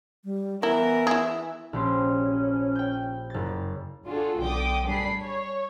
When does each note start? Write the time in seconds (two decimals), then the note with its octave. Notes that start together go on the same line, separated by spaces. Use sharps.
0.24 G3
0.63 E3 B3 E4 A#4
1.07 E4 G#4
1.73 A#1 C#4 G4 C6
2.75 G5 G6
3.30 F#1 A6
4.07 D4 F4 F#4 G#4 A4
4.40 B1 D3 G5 D6 D#6
4.86 G3 D4 G#4 B5 C7
5.19 C#5